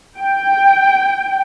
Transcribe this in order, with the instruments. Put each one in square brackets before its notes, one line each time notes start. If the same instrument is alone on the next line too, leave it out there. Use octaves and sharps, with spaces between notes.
[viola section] G5